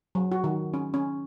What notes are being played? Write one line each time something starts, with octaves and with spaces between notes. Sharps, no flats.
F#3
F#4
D#3
C#4
C#4